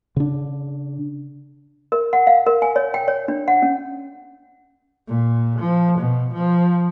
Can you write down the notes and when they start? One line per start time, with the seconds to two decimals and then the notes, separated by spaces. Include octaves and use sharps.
0.16 C#3 D4
1.92 A#4
2.13 F#5
2.27 F5
2.47 A#4
2.62 G#5
2.76 C#5
2.94 G5
3.08 C#5
3.28 D4
3.48 F#5
3.62 C#4
5.07 A#2
5.59 F3
5.98 B2
6.33 F3